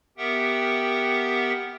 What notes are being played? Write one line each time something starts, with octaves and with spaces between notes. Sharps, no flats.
B3 G4 A#4 E5 F#5 G5